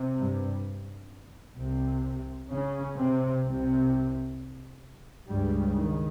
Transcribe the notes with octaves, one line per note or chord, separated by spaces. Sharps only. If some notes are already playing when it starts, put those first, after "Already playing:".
Already playing: C3
G2 G3
C2 C3
C#3 C#4
C3 C4
C2 C3
C#2 G2 C#3 G3
D#3